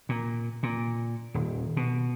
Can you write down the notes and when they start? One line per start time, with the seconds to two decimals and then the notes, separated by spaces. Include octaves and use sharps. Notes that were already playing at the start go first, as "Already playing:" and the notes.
0.09 A#2
0.63 A#2
1.34 D#1
1.77 B2